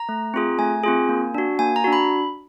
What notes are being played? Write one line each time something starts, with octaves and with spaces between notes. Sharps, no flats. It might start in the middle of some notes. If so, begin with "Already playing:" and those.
Already playing: A#5
A3
C4 F4 G#4
A3 G#5
C4 F4 G#4
A#3
D4 F#4
A#3 G#5
A#5
D4 F#4
B5